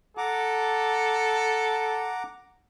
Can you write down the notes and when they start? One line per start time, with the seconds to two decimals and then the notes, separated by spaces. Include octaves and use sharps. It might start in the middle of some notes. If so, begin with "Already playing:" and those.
0.17 A4 F#5 A#5 D6